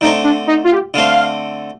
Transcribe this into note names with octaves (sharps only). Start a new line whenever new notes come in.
D3 A3 C4 D#4
D4
D#4
F4
G4
D3 A3 C4 F5